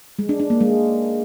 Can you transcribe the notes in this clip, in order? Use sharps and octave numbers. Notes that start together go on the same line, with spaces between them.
G#3
D4
D4
A#3
G#3